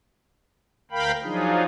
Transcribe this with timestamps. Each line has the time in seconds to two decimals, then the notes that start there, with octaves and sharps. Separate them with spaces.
0.91 D2 A#4 F5 G5 B5
1.23 F3 F#3 D4 D#4 F4 G#4